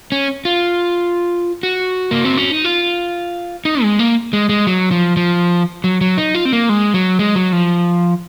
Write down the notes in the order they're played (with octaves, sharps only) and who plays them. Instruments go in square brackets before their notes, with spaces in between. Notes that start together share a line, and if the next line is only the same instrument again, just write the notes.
[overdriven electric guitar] C#4
F4
F#4
A#3
C4
C#4
D#4
F4
D#4
G#3
A#3
G#3
G#3
F#3
F3
F3
F#3
F#3
D#4
F4
C4
A#3
G#3
F#3
G#3
F#3
F3